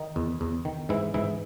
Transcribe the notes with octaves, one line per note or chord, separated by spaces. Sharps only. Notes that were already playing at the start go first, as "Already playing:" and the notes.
Already playing: D#3 D#4
E2
E2
D#3
G#2 E3 E4
G#2 E3 E4